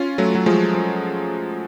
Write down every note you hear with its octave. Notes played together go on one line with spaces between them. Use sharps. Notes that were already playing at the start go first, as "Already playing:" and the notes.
Already playing: C#4 F4
F#3 A3
F#3
F3 G#3
F3